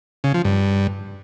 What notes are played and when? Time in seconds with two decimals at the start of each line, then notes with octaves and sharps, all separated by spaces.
0.24 C#3
0.34 F3
0.45 G2